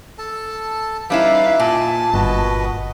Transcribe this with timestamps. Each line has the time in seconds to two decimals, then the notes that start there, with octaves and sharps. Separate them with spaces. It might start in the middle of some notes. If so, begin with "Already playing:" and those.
0.18 A4 A5
1.10 G3 C#4 D#4 E4 B4 E5 F5
1.60 A#2 G#5 A5
2.14 G1 F#4 B4 D#5